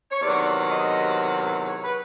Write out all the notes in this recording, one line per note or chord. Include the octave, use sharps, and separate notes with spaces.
C#5
E2 C3 D#3 F#3 D5
D#5
C#5
B4